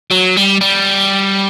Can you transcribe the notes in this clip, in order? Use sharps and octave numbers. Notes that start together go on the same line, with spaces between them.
F#3
G3
G3